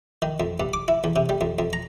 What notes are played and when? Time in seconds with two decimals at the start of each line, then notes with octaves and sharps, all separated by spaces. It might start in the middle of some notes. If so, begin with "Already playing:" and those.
0.22 D#3
0.40 F2
0.60 G2
0.73 D6
0.88 E4
1.04 E2
1.16 C3
1.29 G3
1.41 F2
1.59 F2
1.73 A#5